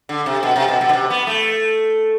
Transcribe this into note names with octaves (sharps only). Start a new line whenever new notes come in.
D3
C3
B2
C3
B2
B2
D3
C3
B3
A3